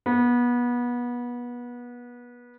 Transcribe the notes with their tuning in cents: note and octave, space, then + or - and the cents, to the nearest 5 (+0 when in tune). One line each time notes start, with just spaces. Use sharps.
B3 -25